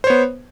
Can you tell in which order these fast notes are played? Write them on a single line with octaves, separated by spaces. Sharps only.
C5 C#5 B3